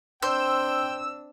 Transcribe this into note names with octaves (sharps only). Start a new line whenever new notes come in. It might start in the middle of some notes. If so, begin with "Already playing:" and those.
C4 D4 C5 G5 E6